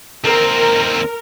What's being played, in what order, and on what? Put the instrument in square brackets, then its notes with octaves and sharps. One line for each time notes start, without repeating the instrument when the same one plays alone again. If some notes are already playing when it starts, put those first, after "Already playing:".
[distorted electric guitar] D#2 C4 [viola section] A#4